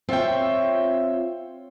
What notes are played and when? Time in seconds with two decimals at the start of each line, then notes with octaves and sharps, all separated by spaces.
0.09 C4 F4 C#5 E5 G5